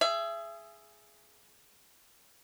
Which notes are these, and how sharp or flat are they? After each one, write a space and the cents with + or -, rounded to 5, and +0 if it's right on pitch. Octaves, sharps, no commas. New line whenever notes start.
G#4 +10 E5 +30